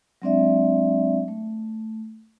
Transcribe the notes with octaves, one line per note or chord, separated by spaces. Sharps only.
F#3 G#3 C4 D4 D5 E5
A3